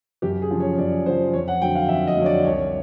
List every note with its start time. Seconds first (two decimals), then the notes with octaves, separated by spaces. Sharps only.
0.22 F#2 G4
0.42 G#4
0.51 C#3 F3
0.60 C#5
0.78 F#2 D5
1.06 C#3 C5
1.10 F3
1.33 F2 C#5
1.48 F#5
1.61 D3 F#3 G5
1.75 F5
1.89 F2 E5
2.07 D#5
2.17 D3 F#3 C#5
2.26 D5
2.44 C2 C#5